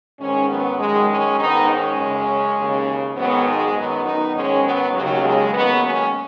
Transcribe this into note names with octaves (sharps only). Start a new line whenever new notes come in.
G#2 D#3 G#3 C#4
F#3 B3
F#2 D#3 G#3
G#3 C#4
G#2 D#3 B3 D#4
G#3 C#4
F#2 C#3
D#2 C#3
G#2 D#3 F#3 B3
G#3
F#2 D#3 F#3 B3
B3 D#4
G#2 D#3 G#3 C#4
F#3 B3
D#2 C#3 F#3
G#3
D#2 D#3 F#3 B3
G#3 C#4